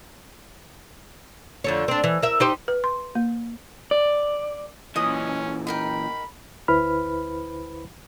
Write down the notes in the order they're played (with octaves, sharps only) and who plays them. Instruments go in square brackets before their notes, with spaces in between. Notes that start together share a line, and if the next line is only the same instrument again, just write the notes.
[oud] F2 D3 C#5
C4 D4
E3
A#4 E5
D#4 G4 C5
[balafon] B4
C6
A#3
[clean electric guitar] D5
[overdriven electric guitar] A#2 E3 [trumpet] C#4 [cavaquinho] D#5 D#6
[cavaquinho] D#4 A#4 G5 [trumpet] B5
[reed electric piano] D2 E4 B4 C5 B5 F6